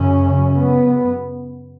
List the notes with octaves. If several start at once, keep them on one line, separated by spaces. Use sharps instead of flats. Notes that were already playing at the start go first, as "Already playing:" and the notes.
Already playing: F#2 C#3 C#4
B3